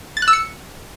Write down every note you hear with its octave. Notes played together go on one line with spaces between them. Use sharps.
A6
F#6
E6
C#7